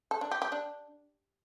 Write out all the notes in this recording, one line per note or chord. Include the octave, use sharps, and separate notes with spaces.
A4
D4
G4
G4
D4